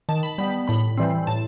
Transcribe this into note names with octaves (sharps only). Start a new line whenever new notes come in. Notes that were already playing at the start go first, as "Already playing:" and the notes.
D#3 A5
B5
G3 B3 B5
A2 B5
E3 G3 C4
A2 A5